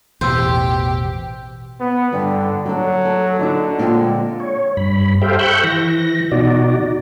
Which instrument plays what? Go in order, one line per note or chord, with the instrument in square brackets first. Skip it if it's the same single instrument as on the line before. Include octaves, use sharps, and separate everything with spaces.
[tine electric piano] A1 B2 E6 [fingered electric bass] E2 [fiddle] G4 G5 [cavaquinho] C5
[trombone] B3
[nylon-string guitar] G2 [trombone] D3
[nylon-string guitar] D3 A4 [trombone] F#3
[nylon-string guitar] A4
[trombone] D3 [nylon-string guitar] D#4 E4 E5
[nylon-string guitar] A#2 G#3 C4
[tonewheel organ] C#5
G2 B5
G4 A4 C5 E5 F5 G5
G5 B5 C#6 E6 F#6 G6
E3 A#6
B2 D#4 F#4 D5